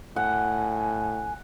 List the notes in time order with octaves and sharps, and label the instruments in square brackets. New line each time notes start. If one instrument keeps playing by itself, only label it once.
[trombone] A2 [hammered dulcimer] F#5 [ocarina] G#5